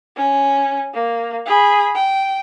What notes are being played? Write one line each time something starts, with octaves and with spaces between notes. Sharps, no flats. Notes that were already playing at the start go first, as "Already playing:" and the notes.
C#4
A#3
G#4 B5
G5